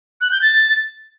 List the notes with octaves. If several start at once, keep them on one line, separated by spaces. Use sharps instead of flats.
F#6
G6
A6